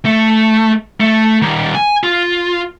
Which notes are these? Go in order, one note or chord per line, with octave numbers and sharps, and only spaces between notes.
A3
A3
D#3 G3
G#5
F4